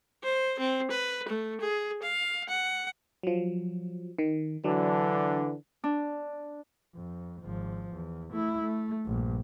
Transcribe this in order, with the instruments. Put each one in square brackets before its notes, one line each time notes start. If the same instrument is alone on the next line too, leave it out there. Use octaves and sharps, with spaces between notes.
[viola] C5
C4
B4
A3
G#4
F5
F#5
[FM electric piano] F3 F#3
D#3
[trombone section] D3 E3 D4 [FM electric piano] F#3
[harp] D4
[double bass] F2
G#1 F3
E2
A3 E4
A3
A#1 G2